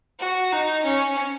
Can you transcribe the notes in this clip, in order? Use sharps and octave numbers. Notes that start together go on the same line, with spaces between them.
F#4
D#4
C#4